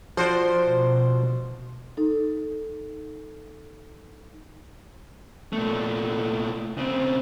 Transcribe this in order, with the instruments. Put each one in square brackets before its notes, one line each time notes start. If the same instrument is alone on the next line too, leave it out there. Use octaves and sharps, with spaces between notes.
[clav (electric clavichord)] F3 F#4 D5 [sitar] C5
[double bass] B2
[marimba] D#4 A4
[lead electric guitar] A#2 A3
C#3 C4